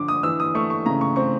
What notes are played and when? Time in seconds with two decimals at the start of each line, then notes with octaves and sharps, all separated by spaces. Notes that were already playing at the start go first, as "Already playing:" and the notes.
Already playing: D3 F3 D6
0.08 D#6
0.23 E3 E6
0.40 D#6
0.55 A3 C#6
0.70 C#6
0.86 C#3 A#5
1.01 C#6
1.16 C4 C#6